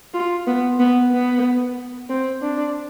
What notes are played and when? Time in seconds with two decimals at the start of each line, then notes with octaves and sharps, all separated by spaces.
0.14 F4
0.47 B3
0.79 B3
1.12 B3
2.09 C4
2.41 D4